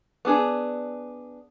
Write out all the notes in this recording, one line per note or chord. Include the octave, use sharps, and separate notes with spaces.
B3 D4 G#4